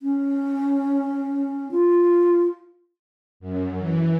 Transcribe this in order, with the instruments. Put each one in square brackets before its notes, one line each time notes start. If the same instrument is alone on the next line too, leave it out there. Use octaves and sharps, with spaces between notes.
[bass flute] C#4
F4
[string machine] F#2
E3